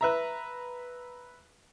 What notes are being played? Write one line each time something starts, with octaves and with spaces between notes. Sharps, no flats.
B4 E5 A#5